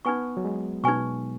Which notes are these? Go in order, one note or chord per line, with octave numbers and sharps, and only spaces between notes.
B3 D#4 B4 G#5 C#6
F#3
G#3
B2 D#4 B4 G#5 C#6